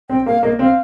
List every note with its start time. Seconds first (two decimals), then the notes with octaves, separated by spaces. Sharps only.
0.10 C4 G5
0.26 A#3 F5
0.43 A#3 D#5
0.59 C4 F5